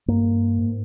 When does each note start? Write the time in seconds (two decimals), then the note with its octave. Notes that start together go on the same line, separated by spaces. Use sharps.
0.08 G2 A#3
0.59 G#2